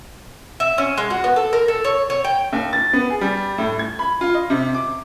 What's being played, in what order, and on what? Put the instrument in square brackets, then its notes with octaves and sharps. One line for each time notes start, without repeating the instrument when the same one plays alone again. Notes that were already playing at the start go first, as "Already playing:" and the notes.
[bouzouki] E5
C#4
G#3
F#4
B3
A4
A#4
A4
C#5
C#5
G5
[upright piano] D#2
A6
B3
G#4
G3
A2
G#6
B5
F4
D#5
C3
D6